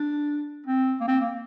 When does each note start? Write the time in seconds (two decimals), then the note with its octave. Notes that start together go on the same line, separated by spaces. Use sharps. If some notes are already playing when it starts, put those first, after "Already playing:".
Already playing: D4
0.66 C4
1.00 A#3
1.08 C4
1.20 A#3